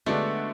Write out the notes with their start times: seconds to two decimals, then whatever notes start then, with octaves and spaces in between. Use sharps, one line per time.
0.06 D3 G#3 A3 B3 D4 F#4